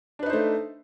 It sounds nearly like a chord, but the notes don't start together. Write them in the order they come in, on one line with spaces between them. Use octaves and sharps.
D4 B4 D#4 C5 A3